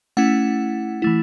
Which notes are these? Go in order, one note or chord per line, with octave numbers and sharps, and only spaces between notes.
A3 C#4 E4 F#5
E3 A3 E4